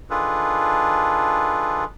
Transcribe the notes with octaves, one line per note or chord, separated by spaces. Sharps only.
D#3 D4 F4 G#4 A4 B4